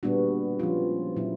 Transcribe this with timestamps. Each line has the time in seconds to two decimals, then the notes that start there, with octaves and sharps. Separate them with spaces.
0.03 A#2 G3 B3 D4 F#4
0.59 F3 G#3 C#4 F4
1.16 A#2 F#3 A#3 C#4 E4